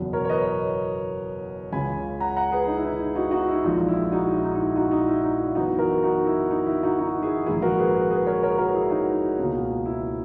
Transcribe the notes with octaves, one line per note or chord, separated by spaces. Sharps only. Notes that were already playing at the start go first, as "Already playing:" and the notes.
Already playing: F#1 E2 B2
A#4 C#5
C#5
B4 D#5
C#2 C#3 G#3 C#4 G#5 B5
F#5 A#5
F#5 A#5
G#4 B4
D#4
E4
D#4
E4
D#4 F#4
D#4 F#4
E4
A#1 A#2 G#3 D#4
E4
D#4 F#4
E4
D#4
D#4
E4
D#4 F#4
D#4
E4
D#4
E4
F#2 E3 B3 D#4 F#4
F#4 A#4
D#4 F#4
E4
D#4
E4
D#4 F#4
D#4 F#4
E4 G#4
A#1 G#2 D#3 A#3 E4 G#4
F#4 A#4
G#4 B4
G#4 B4
G#4 B4
A#4 C#5
A#4 C#5
F#4 A#4
E4 G#4
D#4 F#4
C#2 B2 A#3 C#4
E4